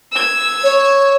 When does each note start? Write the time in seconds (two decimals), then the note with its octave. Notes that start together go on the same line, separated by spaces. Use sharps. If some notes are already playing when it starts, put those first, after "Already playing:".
0.11 E6 G#6
0.63 C#5